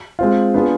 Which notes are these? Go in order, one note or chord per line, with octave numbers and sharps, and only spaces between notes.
G#3 C4 F4
B3 D4 F4 G#4